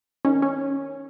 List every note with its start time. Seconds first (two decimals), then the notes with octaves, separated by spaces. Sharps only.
0.25 D#3 C#4
0.42 C#4